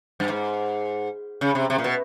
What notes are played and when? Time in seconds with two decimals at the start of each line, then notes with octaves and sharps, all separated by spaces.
0.20 G2
0.29 G#2
1.41 C#3
1.55 C3
1.70 C3
1.78 A#2
1.84 B2